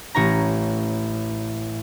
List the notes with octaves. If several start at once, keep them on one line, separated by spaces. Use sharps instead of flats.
A1 C#5 A#5